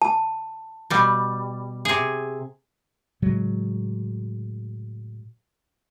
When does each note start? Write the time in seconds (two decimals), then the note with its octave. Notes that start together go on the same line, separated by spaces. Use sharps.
0.02 A5
0.90 B2 G3
1.85 C3 G#4
3.22 A2 C#3 F#3 G#3